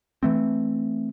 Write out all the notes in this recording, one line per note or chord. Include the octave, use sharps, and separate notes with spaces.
E3 A3 C4